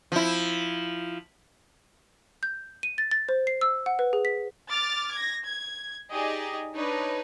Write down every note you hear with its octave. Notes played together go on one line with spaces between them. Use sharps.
F3 E4
G6
D#7
A6
A6
C5
C7
E6
F#5
B4
G#4
B6
D6 F6 A6
G#6 A#6
G#6
D#4 G4 G#4 D5 D#5
D4 D#4 B4 C#5